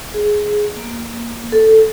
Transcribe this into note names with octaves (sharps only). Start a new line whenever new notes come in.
G#4
A#3
A4